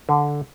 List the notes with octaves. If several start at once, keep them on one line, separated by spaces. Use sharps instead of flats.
D3